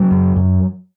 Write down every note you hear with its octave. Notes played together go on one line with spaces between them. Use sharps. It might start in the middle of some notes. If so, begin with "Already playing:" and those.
Already playing: C#3 F#3
F#2
F#2